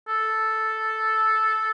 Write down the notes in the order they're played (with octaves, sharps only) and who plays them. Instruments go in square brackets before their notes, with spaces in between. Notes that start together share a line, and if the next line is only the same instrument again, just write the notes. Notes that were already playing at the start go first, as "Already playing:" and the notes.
[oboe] A4